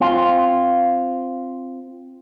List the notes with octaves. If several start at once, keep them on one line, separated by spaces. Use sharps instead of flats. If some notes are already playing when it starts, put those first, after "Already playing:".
C4 F4